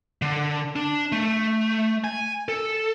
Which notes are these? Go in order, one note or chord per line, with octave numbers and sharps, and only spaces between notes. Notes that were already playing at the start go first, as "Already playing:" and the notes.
D3
D4
A3
G#5
A4